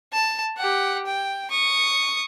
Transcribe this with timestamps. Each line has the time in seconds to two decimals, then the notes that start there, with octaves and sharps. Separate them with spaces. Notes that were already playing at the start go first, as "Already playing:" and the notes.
0.13 A5
0.57 G4 F#5
1.06 G5
1.51 C#6 D#6